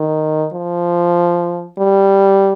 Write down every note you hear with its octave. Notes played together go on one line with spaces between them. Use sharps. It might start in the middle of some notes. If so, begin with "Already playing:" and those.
Already playing: D#3
F3
G3